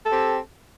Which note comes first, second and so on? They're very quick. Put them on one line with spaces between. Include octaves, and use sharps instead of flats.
A4 G4 C4